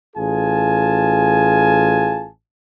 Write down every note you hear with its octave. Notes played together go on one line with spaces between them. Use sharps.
A1 F4 G#4 G#5 A5